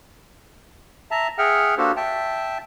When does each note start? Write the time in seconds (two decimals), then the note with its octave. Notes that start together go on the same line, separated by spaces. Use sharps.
1.11 E5 A5 A#5
1.38 G#4 E5 F#5 G5 F6
1.78 A#3 D4 F#4 G4 A4 C5
1.96 E5 G5 A5